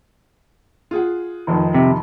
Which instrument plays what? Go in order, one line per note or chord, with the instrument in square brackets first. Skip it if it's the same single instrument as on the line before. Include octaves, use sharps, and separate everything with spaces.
[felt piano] F4 G#4 F#5
F1 F2 D#3
[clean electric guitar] C3